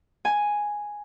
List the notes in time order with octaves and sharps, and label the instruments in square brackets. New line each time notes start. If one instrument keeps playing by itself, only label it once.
[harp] G#5